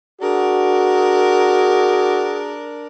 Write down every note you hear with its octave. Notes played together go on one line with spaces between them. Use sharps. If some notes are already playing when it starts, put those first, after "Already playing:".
D4 F#4 G#4 A#4